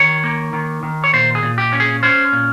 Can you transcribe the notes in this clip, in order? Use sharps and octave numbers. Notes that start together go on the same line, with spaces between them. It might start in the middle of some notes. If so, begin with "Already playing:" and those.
Already playing: D#3 C#5
A#3
D#3
D#3
C#5
A#2 C5
G#4
A#2
G4
C#4
G#4
C#4 C5
A#2